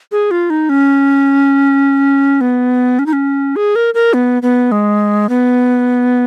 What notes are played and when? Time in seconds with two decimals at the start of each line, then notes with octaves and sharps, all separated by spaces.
0.12 G#4
0.31 F4
0.50 D#4
0.69 C#4
2.41 B3
2.99 C#4
3.06 D#4
3.13 C#4
3.56 G#4
3.76 A#4
3.94 A#4
4.14 B3
4.42 B3
4.72 G#3
5.29 B3